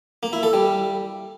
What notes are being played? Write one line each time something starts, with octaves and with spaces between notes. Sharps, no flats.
A#3
E4
A4
G3